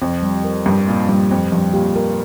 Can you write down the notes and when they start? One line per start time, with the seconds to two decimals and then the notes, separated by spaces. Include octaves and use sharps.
0.02 F2 C4
0.23 G3
0.44 A#4
0.66 G2 G3
0.87 A#2 C4
1.09 G2 G3
1.31 F2 C4
1.52 G2 F3
1.74 A#2 G4
1.96 A#4